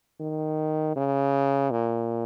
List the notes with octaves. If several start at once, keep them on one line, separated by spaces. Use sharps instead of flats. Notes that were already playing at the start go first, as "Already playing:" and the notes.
D#3
C#3
A#2